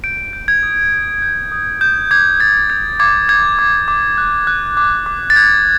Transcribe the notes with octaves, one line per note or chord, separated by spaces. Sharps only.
G6 D7
G6
G#6
D#6
G6
G6
D#6
G6
D6 G#6
G6 A6
G6 G#6
D6 G#6
G6 G#6
D6
D6
F#6
F#6
D6
D6
A6
F#6 G#6